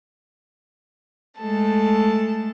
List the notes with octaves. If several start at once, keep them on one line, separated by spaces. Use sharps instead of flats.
G#3 A3 A4 A5